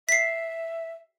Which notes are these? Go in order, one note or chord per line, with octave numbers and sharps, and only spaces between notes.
E5 B6 C7